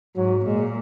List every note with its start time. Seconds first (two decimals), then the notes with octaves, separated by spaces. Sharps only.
0.16 G#2 F#3
0.45 A#2 G#3